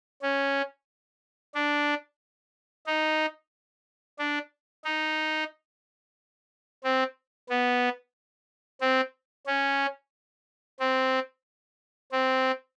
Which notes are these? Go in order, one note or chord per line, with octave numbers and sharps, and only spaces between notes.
C#4
D4
D#4
D4
D#4
C4
B3
C4
C#4
C4
C4